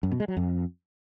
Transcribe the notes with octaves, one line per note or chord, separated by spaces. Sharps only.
F#2
B2
G#3
F#3
F2